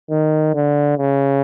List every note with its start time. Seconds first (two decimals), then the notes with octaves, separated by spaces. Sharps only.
0.11 D#3
0.55 D3
0.98 C#3